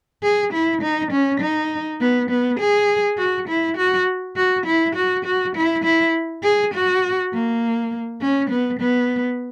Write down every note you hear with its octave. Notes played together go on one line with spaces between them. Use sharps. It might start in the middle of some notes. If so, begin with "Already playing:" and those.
G#4
E4
D#4
C#4
D#4
B3
B3
G#4
F#4
E4
F#4
F#4
E4
F#4
F#4
E4
E4
G#4
F#4
A#3
C#4
B3
B3